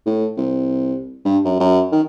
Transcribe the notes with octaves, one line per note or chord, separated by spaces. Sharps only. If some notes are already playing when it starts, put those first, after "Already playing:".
A2
C2
G2
F#2
F#2
D#3